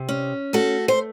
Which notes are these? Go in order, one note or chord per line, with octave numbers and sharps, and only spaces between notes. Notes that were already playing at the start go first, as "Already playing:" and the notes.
Already playing: C3
C#4
A3 F#4 A4
C5